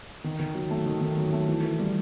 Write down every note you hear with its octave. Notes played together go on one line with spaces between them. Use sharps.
D#3
D#3
F#3
A3
D#3
D#3
F#3
A3
E3
E3
G3